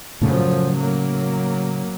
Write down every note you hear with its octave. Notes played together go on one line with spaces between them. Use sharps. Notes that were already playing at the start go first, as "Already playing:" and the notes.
F#2 A2 C#3 F3 A3
F#3 A#3